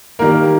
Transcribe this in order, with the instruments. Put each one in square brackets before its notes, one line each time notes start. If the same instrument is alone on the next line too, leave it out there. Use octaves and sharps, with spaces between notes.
[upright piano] D#3 G3 A#3 A#4